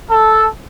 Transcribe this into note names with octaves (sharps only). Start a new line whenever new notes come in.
A4